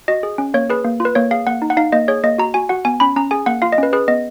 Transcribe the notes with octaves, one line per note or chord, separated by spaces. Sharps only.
F#4 D#5
G#4
C#4
A#3 C#5
G#4 B4
A#3
F4
B4
A#3 C#5
G#4 F5
A#3 F#5
D#4
F#5
D#4 F5
A#3 D#5
G#4 C#5
A#3 D#5
F#4 A#5
F#4 G#5
F#4 F#5
B3 G#5
C#4 B5
C#4 A#5
G#4 G#5
A#3 F#5
F4 F5
D#5
C#4 B4
G#4 B4
B3 D#5